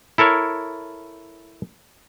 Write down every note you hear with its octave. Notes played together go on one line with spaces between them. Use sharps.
E4 A4 A#4 C#5